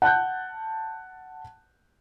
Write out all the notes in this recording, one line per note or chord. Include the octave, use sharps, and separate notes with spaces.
F#5 A5 F#6 G6